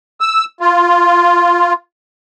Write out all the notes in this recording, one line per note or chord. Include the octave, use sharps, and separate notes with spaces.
E6
F4